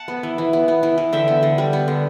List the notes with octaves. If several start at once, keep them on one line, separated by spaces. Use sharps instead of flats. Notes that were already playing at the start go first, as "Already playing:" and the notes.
Already playing: F#5 A5
B3
E3
E3
B3
B3
E3
E3
D3 E5 G5
B3
D3
G3
B3
D3